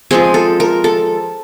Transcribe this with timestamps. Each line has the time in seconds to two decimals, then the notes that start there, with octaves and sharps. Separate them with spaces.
0.11 F3 G#3 C4 G#4
0.34 A4
0.60 A#4
0.84 A4